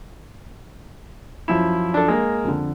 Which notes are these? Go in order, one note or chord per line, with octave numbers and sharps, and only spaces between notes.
F#2 F3 E4 E7
D4 A4
G#3 A#3
F2 D3